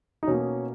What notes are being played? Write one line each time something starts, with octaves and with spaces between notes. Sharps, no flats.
D#4
B2 A#3 C#4